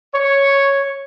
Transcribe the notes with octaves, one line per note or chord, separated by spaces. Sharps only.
C#5